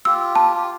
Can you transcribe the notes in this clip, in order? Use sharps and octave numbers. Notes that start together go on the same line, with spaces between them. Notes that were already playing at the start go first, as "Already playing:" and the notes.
F4 G4 E6
A5
G4